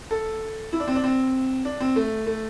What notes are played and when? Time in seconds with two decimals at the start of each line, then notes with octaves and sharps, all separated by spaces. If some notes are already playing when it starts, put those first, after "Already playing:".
0.11 A4
0.73 E4
0.80 D4
0.88 C4
0.96 D4
1.04 C4
1.65 D4
1.81 C4
1.96 A3
2.27 A3